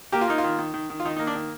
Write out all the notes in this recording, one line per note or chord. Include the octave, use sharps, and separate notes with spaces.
A#3 G4
F4
A#3 D#4
F4
D#3
D#3
D#3
D#3
F4
D#3 D#4
D#4
A#3
D4
D#3